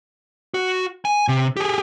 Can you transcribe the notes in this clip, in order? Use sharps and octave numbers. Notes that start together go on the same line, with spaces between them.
F#4
G#5
C3
G4 G#4